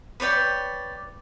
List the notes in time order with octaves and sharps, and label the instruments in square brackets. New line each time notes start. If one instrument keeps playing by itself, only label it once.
[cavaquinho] B4 C#5 D5 G5